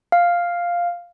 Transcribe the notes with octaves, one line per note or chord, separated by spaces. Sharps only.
F5